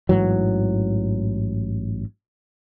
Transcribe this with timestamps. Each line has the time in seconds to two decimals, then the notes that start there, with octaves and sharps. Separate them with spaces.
0.09 A1 G#2 E3 F#3